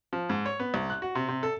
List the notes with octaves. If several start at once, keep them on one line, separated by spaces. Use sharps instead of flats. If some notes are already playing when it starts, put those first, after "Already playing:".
F3
G#2
C#5
B3
C2
F#6
F#4
C3
C3
A4